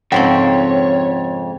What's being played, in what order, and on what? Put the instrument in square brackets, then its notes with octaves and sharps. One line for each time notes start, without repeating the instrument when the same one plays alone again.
[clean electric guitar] F2 [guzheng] G#2 C#3 C4 [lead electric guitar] C#5 [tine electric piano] F#5 G5